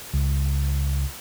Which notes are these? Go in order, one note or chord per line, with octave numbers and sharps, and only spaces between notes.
C#2